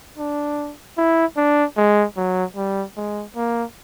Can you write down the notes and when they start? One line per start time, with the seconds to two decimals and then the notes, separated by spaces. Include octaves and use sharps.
0.18 D4
0.97 E4
1.37 D4
1.77 G#3
2.17 F#3
2.56 G3
2.97 G#3
3.36 A#3